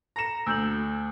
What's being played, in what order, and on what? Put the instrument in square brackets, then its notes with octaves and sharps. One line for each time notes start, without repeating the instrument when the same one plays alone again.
[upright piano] A#5 E7 [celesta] A#6 C#7
[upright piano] D2 [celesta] E6 G6 F#7